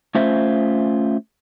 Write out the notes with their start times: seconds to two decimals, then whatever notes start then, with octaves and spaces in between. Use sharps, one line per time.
0.15 A3 C#4 F4 C5 E5